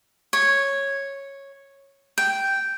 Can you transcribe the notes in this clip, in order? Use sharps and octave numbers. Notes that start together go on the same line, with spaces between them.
C#5
G5